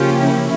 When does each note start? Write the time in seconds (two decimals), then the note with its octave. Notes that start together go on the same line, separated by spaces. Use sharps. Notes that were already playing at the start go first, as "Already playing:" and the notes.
Already playing: C#3 F3 A#3 C#4 F4 G4
0.26 E4